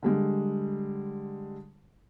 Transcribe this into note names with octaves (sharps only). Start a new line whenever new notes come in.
D3 G3 G#3